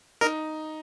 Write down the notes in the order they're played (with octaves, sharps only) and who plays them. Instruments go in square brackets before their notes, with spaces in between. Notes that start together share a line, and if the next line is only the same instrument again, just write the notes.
[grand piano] D#4 [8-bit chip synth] A#4